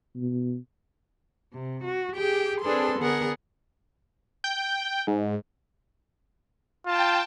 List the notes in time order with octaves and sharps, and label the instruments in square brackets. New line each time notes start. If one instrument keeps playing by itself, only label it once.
[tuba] B2
[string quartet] C3
F#4
G4 G#4 G5
C4 D4 G#4 A4 B4 C6
D3 B3 G#4 A#4 F#5
[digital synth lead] G5
G#2
[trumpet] F4 [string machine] G5 A5